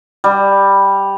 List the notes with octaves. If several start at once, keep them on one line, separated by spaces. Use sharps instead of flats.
G3